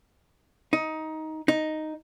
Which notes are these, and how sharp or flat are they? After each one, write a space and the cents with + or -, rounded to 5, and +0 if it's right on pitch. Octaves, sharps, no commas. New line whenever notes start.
D#4 +15
D#4 +0